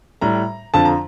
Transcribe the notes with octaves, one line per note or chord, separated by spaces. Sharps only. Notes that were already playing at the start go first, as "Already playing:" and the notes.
A2 G3 A#5
F2 D3 F3 A5
A#5